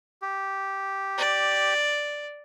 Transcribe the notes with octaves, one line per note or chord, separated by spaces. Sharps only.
G4
D5